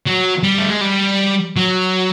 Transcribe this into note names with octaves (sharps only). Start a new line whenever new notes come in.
F#3
G3
A3
G#3
G3
F#3